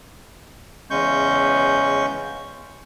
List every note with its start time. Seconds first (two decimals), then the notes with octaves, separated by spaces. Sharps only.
0.90 E2 C#3 G#3 C#4 C#6 G6